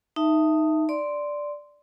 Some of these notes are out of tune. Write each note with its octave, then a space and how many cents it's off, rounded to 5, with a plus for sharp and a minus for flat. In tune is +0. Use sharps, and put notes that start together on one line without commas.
D#4 +0 E5 +10 A5 +20
D5 +0 C6 -5